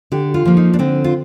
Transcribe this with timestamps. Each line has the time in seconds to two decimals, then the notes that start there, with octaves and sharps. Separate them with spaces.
0.12 D3 G4
0.34 F4
0.45 F3 A#3
0.57 D#4
0.74 D4
0.79 D3 C4
1.04 F4